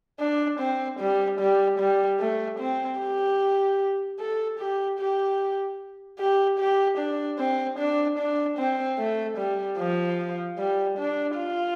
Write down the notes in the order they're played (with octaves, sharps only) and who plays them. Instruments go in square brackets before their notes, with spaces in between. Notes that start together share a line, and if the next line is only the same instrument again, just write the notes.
[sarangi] D4
C4
G3
G3
G3
A3
C4
G4
A4
G4
G4
G4
G4
D4
C4
D4
D4
C4
A3
G3
F3
G3
D4
F4